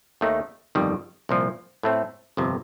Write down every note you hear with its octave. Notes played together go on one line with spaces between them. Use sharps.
D#2 D#3 A3 D#4
G1 F2 D#3 G3
C2 A#2 F3
A2 A3 C4
G1 F2 C3